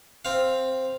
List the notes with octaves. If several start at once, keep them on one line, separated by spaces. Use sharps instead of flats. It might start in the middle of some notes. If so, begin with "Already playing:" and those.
C4 F5